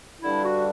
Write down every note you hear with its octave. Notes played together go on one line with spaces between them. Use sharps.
G2 D3 G3 D4 E4
F#4